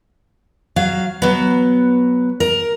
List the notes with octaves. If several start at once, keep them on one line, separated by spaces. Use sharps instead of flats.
F#3 F5
F#3 B3
A#4